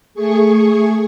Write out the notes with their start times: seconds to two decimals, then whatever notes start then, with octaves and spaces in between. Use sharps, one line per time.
0.14 A3 G#4 C#6